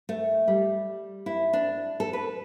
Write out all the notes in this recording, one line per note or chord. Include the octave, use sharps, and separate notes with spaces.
A3
G3
E4
D4
A4
B4